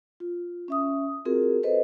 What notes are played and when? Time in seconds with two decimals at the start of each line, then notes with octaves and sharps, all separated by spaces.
0.20 F4
0.68 C#4 E5 D#6
1.25 C4 F4 F#4 G#4 A#4
1.63 A4 B4 C5 D#5